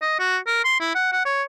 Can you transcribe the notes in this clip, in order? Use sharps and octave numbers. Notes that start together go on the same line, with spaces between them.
D#5
F#4
A#4
C6
E4
F#5
F#5
C#5